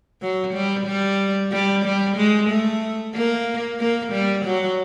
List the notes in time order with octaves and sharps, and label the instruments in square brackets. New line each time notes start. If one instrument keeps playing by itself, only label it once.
[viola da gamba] F#3
G3
G3
G3
G3
G#3
A3
A#3
A#3
G3
F#3